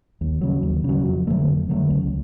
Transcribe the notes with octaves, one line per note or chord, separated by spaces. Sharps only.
D#2
C#3 F#3
D#2
C#3 F#3
F2
D3 F#3 A3
F2
D3 F#3 A3
C#2